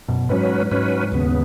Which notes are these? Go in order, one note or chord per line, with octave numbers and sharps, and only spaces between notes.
F#2 B2
G#2 F#3 C#4 B4
G#2 F#3 C#4 B4
D#2 C#3 B3